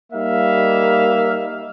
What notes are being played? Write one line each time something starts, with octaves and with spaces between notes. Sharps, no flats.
G3 A#3 D#4 E5 F5